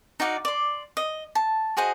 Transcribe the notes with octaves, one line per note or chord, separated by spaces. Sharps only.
D#4 F#4 D5 F5
D5 C6
D#5
A5
F#4 G#4 C5 D#5